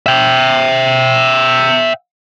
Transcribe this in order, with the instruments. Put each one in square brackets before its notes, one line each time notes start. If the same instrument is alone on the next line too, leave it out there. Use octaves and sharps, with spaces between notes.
[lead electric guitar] E5 G5